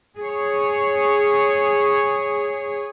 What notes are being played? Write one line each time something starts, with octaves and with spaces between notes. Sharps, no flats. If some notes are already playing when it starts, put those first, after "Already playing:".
G#4 C#5